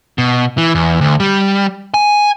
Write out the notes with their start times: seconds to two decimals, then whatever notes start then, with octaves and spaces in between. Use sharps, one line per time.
0.18 B2
0.58 E3
0.75 E2
1.01 D2
1.20 G3
1.94 G#5